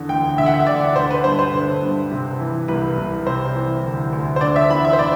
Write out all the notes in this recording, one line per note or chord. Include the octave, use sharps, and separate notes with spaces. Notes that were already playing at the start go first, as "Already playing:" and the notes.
Already playing: E2 D3
D2 G5
D3 E5
F#5
E5
D2 D5
D3 C5
B4
G2 C5
C5
D3
G2
C3
E3
C2 B4
C2
C3 C5
E3
D2
D2
C5
D3 D5
E5
E2 B5
E5
C5
D3 D5